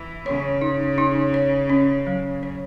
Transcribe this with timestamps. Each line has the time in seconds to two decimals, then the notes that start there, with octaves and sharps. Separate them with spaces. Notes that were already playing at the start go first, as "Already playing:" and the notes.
Already playing: E3
0.26 C#3 C#5
0.61 D#4
0.98 D#4
1.34 C#5
1.70 C#4
2.07 F#3
2.43 C#5